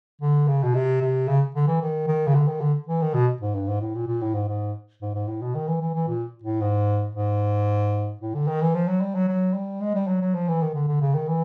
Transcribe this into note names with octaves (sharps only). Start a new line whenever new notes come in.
D3
C#3
B2
C3
C3
C#3
D3
E3
D#3
D#3
C#3
D3
D#3
D3
E3
D#3
B2
G#2
G2
G#2
A2
A#2
A#2
A2
G#2
G#2
G#2
G#2
A2
B2
D#3
E3
E3
E3
A#2
A2
G#2
G#2
A2
D3
D#3
E3
F3
F#3
G3
F#3
F#3
G3
G#3
G3
F#3
F#3
F3
E3
D#3
D3
D3
C#3
D#3
E3